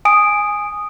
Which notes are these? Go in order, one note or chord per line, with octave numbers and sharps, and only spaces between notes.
G#5 D#6 D7